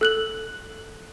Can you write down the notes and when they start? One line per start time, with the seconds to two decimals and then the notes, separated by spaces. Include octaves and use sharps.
0.01 A4 F#6 F#7